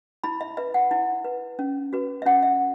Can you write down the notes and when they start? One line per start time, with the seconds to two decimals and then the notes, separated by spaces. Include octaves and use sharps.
0.24 E4 B5
0.41 E5
0.57 B4 E5
0.74 F#5
0.91 E4
1.25 B4
1.59 C#4
1.93 F#4 B4
2.22 E5
2.26 C#4 F#5
2.43 E5